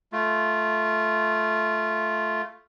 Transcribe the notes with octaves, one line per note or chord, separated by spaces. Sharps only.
A3 F4